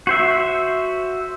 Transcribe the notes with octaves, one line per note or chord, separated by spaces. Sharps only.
F#4 C5 E5